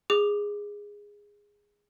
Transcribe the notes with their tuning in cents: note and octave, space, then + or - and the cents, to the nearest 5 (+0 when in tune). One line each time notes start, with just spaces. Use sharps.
G#4 -10 D6 +0